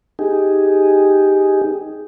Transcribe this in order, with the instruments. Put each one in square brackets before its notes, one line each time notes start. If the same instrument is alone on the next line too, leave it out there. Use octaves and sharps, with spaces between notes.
[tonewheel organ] D#4 G4 G#4